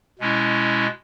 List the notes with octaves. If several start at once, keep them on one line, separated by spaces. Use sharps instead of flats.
B2 G#3 C#4 E4